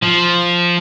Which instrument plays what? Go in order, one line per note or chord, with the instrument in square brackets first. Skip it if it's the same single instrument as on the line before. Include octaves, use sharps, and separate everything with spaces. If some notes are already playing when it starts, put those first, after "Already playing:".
[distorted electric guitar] F3